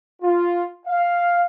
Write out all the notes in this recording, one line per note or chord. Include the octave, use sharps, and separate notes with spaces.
F4
F5